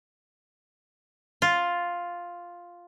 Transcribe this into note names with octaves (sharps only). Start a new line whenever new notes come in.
F4